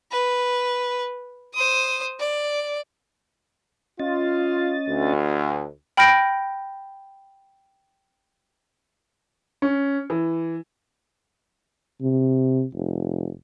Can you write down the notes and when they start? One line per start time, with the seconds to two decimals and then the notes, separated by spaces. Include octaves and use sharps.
0.11 B4
1.54 C5 D#6
2.19 D5
3.99 C#4 F4 D#5 A6
4.88 D2
5.97 G5 B5 F6 G6 A#6 D7
9.62 C#4
10.10 E3
12.01 C3
12.74 F1